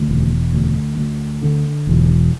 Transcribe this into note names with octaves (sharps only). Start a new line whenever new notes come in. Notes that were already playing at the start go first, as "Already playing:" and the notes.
Already playing: D2
E1
D2
D2
D3
E1